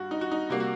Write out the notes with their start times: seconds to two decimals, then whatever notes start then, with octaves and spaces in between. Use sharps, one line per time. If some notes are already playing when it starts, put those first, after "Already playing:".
Already playing: G2 F#4
0.11 D#4
0.21 F#4
0.31 D#4
0.50 C3 G3 A#3 F#4
0.60 F#4